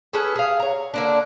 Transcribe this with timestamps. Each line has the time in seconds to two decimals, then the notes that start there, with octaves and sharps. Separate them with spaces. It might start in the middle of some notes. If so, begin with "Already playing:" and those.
0.13 C#4 G#4 A4 B4
0.35 G#4 F5
0.60 C#5 A#5
0.94 D3 A#3 D4